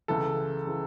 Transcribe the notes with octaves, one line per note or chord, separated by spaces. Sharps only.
C#2 C#3 E3 A4
C#3 E3